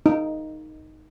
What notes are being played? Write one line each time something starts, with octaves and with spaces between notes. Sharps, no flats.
D#4